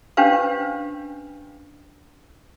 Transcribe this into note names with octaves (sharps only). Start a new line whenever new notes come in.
C#4 D4 G4 B4 C5 F5